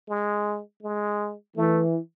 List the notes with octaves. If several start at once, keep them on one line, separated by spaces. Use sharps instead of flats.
G#3
G#3
E3 A3